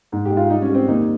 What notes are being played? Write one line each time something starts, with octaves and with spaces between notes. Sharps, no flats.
G#2
G4
G#3
F4
G3 D#4
C#4
G3
C4
D#2 D#4